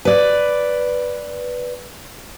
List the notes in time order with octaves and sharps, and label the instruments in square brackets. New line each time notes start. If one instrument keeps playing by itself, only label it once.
[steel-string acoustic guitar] B4 D5